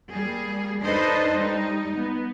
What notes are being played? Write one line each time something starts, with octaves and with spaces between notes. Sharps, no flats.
G3 A#3 G#4
D4 D#4 A4 B4 C5 D#5
G3 D#4
B3